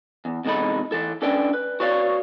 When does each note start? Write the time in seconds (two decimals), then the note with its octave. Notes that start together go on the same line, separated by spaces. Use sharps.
0.25 E2
0.45 E2 C3 G#3 D#4 A4 B5
0.92 E3 A4
1.22 C#4 D4 A4 B4 D5 G5
1.54 B4
1.80 F#4 B4 C#5 D5 F5